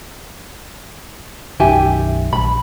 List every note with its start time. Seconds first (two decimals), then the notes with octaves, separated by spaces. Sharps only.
1.60 B1 F#2 D#3 G4 E5 G#5
2.33 A#1 B5